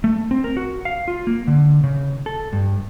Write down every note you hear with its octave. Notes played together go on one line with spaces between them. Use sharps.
A3
C4
A#4
F#4
F5
F4
A#3
D3
C#3
A4
G2